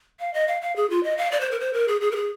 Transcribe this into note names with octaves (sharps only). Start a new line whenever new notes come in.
F5
D#5
F5
F5
G#4
F4
D#5
F5
D5
C5
A#4
C5
A#4
G#4
G#4
A#4
G#4